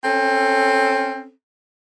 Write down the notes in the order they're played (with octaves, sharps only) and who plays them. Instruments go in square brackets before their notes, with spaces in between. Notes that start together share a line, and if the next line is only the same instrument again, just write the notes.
[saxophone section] C4 C#4 A4